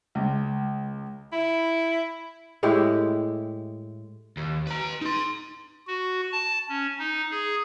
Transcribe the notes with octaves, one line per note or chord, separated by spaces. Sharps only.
C#2
E4
A2 G#3 E4 G4
D#2
B4 A#5
D#4 C6
F#4
A5
C#4
D#4
G#4